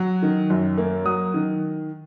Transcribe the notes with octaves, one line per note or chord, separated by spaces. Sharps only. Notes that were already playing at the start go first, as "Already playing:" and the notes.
Already playing: F#3
D#3
F#2
A#3
F#3 D#6
D#3